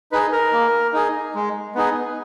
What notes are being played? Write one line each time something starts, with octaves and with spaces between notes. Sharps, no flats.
D#4 G#4 B4
A#4
A#3
D#4 G#4
G#3
B3 D#4 G#4